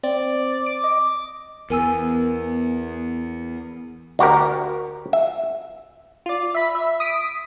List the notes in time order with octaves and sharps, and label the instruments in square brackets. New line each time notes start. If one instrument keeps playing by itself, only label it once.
[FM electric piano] C4 [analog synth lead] D5
[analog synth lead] D6
[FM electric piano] D#5
[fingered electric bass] E2 [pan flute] B3 [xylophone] A#4 G#5 E6
[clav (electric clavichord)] D2 F#4 G4 A#4
E5
[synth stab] F4 D5
E5 B5 B6
E5
D#6 B6 D7